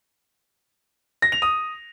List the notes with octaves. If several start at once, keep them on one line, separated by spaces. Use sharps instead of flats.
A#6
F7
D#6